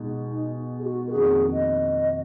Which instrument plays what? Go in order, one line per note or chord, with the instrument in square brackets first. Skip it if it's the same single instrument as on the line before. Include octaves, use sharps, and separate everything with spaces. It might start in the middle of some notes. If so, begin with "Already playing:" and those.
Already playing: [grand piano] B2 G#3 D#4
[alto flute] D#4
G#4
F#4
A#4
[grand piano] F2 D#3 A#3 D4 F#4 [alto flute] G#4
[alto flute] D#5